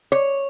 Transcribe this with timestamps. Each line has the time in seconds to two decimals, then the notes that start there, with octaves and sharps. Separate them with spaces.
0.12 C#5